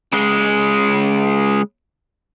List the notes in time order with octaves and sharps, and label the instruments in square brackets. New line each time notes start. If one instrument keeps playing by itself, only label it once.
[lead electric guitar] C#3 G#3